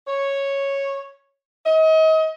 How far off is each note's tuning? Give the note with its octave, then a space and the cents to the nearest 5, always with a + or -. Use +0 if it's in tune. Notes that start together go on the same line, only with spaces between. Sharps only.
C#5 -5
D#5 +35